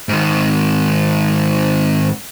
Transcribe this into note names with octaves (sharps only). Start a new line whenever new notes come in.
G#2 D#3